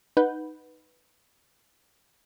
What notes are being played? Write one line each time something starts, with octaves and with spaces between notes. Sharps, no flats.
D#4 B4 F#5 G6